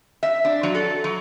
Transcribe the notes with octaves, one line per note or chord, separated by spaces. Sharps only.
E5
D4
F#3
A4
F#3